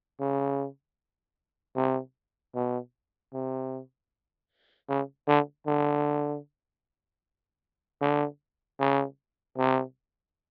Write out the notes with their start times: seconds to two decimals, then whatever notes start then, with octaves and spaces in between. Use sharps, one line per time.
0.20 C#3
1.76 C3
2.55 B2
3.33 C3
4.89 C#3
5.28 D3
5.67 D3
8.02 D3
8.80 C#3
9.58 C3